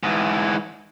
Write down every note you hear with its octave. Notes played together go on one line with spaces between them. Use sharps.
G#2 E3